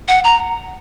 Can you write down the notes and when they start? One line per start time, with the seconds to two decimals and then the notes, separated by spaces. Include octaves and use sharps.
0.08 F#5
0.24 A#5